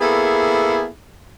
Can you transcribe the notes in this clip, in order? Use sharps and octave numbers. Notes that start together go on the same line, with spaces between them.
A#3 B3 E4 G#4 A4